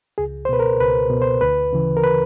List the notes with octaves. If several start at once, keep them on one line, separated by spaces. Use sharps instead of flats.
C#2 G#4
C5
B2 B4
A#4
C#2 B4
B2
C5
D2 B4
C#3 E3
A#4
B4